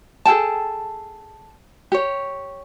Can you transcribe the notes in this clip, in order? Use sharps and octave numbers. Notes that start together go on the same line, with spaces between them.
G#4 A4 G5 A5
G4 C#5